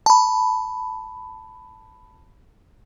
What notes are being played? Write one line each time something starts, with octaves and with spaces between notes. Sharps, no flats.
A5 B5